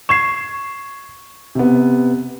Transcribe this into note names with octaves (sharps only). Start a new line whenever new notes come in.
C#6 G#6 C7 E7
C3 B3